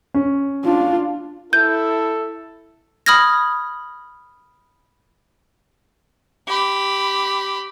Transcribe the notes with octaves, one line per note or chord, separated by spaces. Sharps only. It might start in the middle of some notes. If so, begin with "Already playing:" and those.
C#4
D4 F4
E4 A4 G6
B5 D#6 F6 G#6 A#6
G4 B5